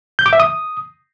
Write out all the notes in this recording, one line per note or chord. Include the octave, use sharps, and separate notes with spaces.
G6
D6
E5
D#6